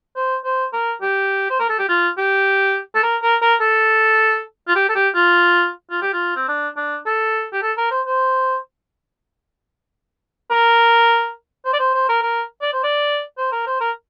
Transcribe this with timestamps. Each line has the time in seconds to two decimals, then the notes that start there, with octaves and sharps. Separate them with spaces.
0.16 C5
0.45 C5
0.73 A#4
1.02 G4
1.50 C5
1.59 A#4
1.70 A4
1.79 G4
1.89 F4
2.18 G4
2.95 A4
3.03 A#4
3.22 A#4
3.42 A#4
3.61 A4
4.68 F4
4.76 G4
4.89 A4
4.95 G4
5.15 F4
5.91 F4
6.02 G4
6.13 F4
6.36 C4
6.48 D4
6.77 D4
7.06 A4
7.53 G4
7.62 A4
7.77 A#4
7.91 C5
8.06 C5
10.50 A#4
11.65 C5
11.73 D5
11.79 C5
11.94 C5
12.09 A#4
12.22 A#4
12.62 D5
12.73 C5
12.83 D5
13.38 C5
13.52 A#4
13.67 C5
13.81 A#4